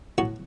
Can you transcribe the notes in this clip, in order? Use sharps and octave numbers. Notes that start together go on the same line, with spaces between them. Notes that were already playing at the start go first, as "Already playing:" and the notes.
A2 F#4